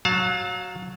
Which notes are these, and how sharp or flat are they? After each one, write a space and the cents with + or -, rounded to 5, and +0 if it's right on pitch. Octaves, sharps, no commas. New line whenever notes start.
F#3 +0 F5 +35 A5 +0